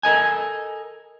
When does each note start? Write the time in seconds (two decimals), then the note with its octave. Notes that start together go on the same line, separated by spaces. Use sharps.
0.03 A4 A#4 D#5 G#5